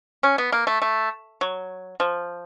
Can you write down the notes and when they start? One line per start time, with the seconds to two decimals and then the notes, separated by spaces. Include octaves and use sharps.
0.23 C#4
0.38 B3
0.52 A#3
0.67 A3
0.82 A3
1.41 F#3
2.00 F3